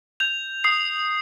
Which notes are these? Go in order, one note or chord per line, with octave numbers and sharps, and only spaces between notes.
G6 F7
D#6 C7